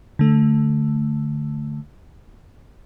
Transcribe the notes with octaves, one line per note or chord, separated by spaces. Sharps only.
D3 A3